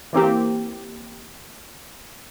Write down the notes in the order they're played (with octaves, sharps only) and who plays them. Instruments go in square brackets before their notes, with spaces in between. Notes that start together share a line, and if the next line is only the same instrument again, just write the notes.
[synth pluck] E3 A#3 C4 G4